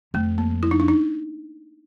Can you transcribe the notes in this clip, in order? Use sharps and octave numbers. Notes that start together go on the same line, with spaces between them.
F2 A3
A#3
E4
D#4
D4
D#4